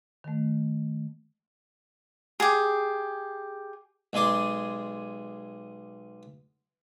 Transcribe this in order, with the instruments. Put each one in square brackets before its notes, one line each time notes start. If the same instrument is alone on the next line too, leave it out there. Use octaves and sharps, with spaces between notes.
[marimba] D#3 A3
[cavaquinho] G4 G#4
[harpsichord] B1 G#3 G#4 D5 C6